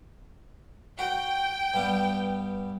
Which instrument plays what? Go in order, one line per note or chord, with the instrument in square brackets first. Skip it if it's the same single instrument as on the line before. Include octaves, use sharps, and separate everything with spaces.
[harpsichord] F#4 [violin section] G5
[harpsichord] G2 G3 B3